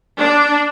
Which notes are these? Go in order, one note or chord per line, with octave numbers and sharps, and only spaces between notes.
D4